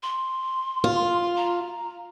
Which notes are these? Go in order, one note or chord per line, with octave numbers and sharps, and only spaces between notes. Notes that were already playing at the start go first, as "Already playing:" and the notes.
C6
F4
A#5